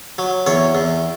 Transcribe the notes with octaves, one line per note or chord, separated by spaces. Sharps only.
F#3
E2 C#5
E2